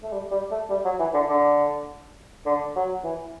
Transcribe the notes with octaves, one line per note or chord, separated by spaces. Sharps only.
A3
G3
G3
A3
G3
F#3
E3
D3
D3
D3
F#3
E3